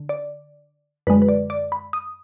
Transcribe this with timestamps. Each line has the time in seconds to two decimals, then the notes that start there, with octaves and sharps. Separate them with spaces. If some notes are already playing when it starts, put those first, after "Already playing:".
Already playing: D3
0.09 D5
1.07 F#2 D3 G#3 B4
1.22 B4
1.28 D5
1.50 D5
1.72 B5
1.93 D#6